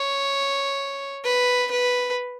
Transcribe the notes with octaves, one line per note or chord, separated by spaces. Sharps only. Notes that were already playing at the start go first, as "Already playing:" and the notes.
Already playing: C#5
B4
B4